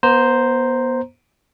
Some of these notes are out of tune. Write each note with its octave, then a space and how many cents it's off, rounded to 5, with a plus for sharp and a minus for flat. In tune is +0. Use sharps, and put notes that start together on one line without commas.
B3 -30 C5 +0 A#5 +0